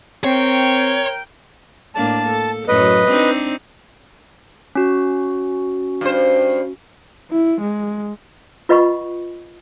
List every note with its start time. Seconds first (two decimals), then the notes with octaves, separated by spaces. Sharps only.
0.24 C4 A#4 C#5 G5
1.95 A2 A#3 D4 A5
2.27 A4
2.68 F#2 A2 F#3 B4 D#5
3.08 C4 D4 D#4
4.75 C#4 F#4
6.01 G2 C5
7.31 E4
7.61 G#3
8.69 F4 B4 D#5 F#5 B5 C#6